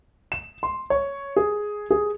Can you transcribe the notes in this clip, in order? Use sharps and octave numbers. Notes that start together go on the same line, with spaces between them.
E7
C6
C#5
G#4
G#4